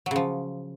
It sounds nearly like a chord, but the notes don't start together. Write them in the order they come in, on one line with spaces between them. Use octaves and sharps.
F#3 C#3 F3